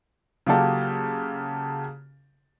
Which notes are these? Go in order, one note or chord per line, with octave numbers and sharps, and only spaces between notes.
C#3 F#3 A#3 F4 G4 A4